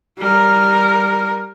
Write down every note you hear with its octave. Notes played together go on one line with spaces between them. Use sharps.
G3 A#4